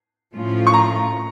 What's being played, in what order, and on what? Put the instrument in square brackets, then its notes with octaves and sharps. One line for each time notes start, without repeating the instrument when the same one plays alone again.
[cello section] A2 F3 A3 C#4 F4
[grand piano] C#6
A#5